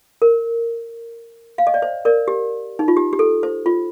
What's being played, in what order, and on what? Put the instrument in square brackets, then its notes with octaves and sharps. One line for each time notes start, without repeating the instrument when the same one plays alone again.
[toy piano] A#4
F5
D#5
D5
C5
A#4 D5
G4
D#4
F4
G4
G4
A4
C5
F4